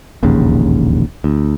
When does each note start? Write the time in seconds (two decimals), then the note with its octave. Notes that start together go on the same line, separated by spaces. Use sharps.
0.23 E1 A#1 D#2 C#3
1.24 D2